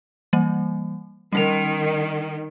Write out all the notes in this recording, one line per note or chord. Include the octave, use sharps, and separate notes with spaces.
E3 G3 A#3
D#3 G3 C#4 F7